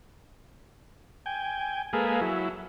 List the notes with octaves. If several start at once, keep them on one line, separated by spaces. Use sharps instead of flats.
G5 G#5
G#3 A#3 G#4 A4 B4 F5
F#3 E4